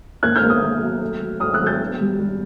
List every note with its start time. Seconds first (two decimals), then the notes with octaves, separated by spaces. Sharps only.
0.23 A#3 F#6 G#6
0.36 F6 G6
0.42 A#3
0.49 D#6 F6
0.63 A#3
0.82 F#3
1.02 A3
1.21 F#3
1.40 A3 D#6 F6
1.53 E6 F#6
1.60 F#3
1.66 G6 A6
1.80 B3
2.00 G3
2.19 G3